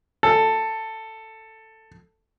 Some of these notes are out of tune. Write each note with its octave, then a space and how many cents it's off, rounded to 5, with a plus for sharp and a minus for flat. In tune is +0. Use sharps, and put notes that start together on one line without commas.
A4 +10